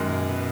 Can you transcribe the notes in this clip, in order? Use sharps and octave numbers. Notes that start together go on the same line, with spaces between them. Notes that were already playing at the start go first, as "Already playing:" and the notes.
Already playing: F#2 D#3 G#3
A#2
B2